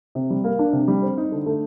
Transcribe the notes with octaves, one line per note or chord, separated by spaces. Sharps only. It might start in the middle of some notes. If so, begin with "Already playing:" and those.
C3
G3
A#3
D4
C3
G3
C4
D#4
D3
A3